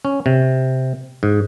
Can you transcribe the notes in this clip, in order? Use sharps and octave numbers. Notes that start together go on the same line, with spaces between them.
C#4
C3
G#2